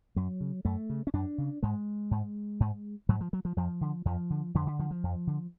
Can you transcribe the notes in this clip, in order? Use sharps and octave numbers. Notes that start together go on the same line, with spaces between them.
F#2 F#3
C#3
F#2 A3
C#3
C#4
F#2 D4
C#3
G#2 G#3
G#2
G#2
G#2 F#3
F3
F#3
F3
F2 F3
D3
F2 F3
D3
F2 D3
D3
D3 F3
F3
F2
D3